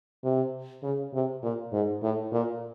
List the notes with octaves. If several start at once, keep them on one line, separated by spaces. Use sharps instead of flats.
C3
C#3
C3
A#2
G#2
A2
A#2